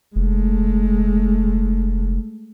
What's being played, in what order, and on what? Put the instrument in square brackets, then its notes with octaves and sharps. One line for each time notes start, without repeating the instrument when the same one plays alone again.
[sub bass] F1 [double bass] G#3 A3